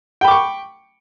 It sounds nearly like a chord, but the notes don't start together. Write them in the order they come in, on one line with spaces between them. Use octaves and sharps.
G5 B5 D6 C#6